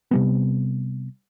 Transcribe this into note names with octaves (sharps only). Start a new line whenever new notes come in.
C3 G3 B3